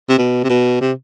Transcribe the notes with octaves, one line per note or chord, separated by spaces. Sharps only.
C3
B2
C3
B2
C3